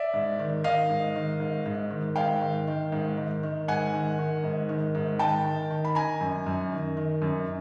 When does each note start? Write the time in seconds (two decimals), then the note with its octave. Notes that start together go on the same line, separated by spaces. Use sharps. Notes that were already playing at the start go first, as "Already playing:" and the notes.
Already playing: D5 E5
0.14 G#2
0.39 D#3
0.64 D#3 D#5 F5
0.90 G#2
1.15 D#3
1.40 G#2
1.66 G#2
1.90 D#3
2.16 G#2 F5 G5
2.41 D#3
2.67 D#3
2.92 G#2
3.17 D#3
3.43 D#3
3.68 G#2 F#5 G#5
3.93 D#3
4.19 D#3
4.44 G#2
4.69 D#3
4.95 G#2
5.19 D#3 G5 A5
5.45 D#3
5.70 D#3
5.85 B5
5.95 D#3 G#5 A#5
6.21 F#2
6.47 F#2
6.72 D#3
6.97 D#3
7.22 F#2